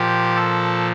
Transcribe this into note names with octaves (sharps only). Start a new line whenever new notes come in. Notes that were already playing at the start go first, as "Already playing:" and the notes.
Already playing: A#2 F3 G4
A4